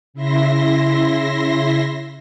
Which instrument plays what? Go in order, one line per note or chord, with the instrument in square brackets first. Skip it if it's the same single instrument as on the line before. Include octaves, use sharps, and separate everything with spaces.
[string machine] C#3 E4 E5 C6 A#6